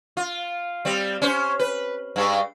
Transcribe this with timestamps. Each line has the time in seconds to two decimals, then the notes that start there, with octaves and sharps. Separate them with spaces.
0.17 F4
0.85 G3 C4
1.22 C#4 C5
1.59 B4
2.16 G2 G#3